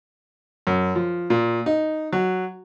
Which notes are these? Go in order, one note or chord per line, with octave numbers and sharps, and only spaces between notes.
F#2
F3
A#2
D#4
F#3